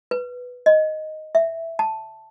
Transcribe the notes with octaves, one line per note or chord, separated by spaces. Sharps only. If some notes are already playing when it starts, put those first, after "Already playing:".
B4
D#5
E5
A5